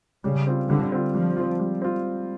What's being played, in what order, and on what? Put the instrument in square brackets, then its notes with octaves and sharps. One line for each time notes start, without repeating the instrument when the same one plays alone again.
[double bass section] C#3 [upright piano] G3
[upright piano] C4 F4
[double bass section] D3 [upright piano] G3
[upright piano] C4 F4
[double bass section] F3 [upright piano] G3
[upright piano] C4 F4
G3
C4 F4